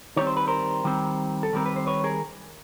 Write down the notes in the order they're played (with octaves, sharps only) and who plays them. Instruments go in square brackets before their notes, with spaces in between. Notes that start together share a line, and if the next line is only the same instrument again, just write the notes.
[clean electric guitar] D#3 G3 C4 C#5
C5
B4
A#4 C5
D#3 G3 C4
A4
D#3 G3 C4 A#4
B4
C5
B4 C#5
G#4 A#4